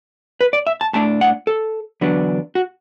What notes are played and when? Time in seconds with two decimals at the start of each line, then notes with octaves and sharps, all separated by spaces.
0.41 B4
0.53 D5
0.67 E5
0.81 A5
0.93 A2 A3 D4 A5
1.21 F#5
1.47 A4
2.01 E2 D3 F#3 B3 D4
2.55 F#4